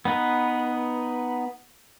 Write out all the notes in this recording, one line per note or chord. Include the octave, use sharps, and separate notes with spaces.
B3 D#4 B4